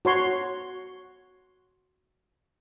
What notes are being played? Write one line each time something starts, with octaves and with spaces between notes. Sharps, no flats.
F#4 C#5 C6